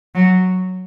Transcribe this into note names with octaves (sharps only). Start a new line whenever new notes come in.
F#3